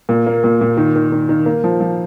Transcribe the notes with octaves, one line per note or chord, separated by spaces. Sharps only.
A#2
A#3
A#2
A#2
D#3
D#3
D#3
D#3
A#3
F3
F3